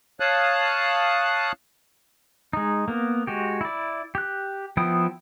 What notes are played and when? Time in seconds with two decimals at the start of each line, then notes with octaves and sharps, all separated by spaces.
0.20 C#5 F5 A5 D#6 F#6
2.53 G#3 D#4
2.88 A#3 B3
3.27 G#3 F#4 G4
3.61 E4 D5
4.15 G4 F#6
4.77 F3 B3 E4 G5 D#6